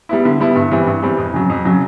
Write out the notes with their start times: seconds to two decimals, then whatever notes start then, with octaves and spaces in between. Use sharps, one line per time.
0.09 G3 B3 E4
0.25 D3
0.40 G3 B3 E4
0.56 G2
0.72 E3 G3 C4
0.87 G2
1.02 E3 G3 C4
1.18 F2
1.33 C#3 F#3
1.50 F2
1.65 C#3 F#3